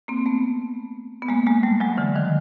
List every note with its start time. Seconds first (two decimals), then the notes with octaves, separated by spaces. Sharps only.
0.08 A#3 C4
0.26 A3 B3
1.22 B3
1.28 G#3 A#3
1.46 G#3 A#3
1.63 G3 A3
1.80 F#3 G#3
1.97 D3 E3
2.15 D#3 F3